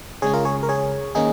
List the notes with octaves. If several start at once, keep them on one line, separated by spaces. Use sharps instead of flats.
C#3 G#3 C#4 G#4 C#5
F4 A#4
G#4 C#5
A#4
G#4 C#5
D#3 A#3 C#4 D#4 G#4